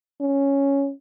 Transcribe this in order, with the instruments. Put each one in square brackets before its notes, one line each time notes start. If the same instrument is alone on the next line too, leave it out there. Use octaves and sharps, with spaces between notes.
[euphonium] C#4